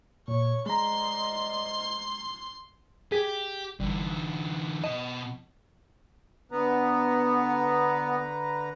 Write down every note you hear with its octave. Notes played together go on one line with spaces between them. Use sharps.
A#2 C#5 C#6
G#3 C5 D5 D#5 A#5 C6
G4 G#4 B6
G1 D3 E3
B2 D#5 A5
D3 B3 B4 A#5